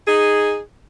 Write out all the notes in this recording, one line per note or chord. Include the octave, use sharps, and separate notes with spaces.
D#4 G#4